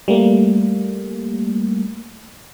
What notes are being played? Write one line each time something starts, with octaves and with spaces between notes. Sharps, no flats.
G3 A3 A#3